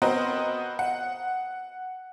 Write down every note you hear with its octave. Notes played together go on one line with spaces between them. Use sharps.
B3 C4 F#4 A#4 C5 D#5
F#5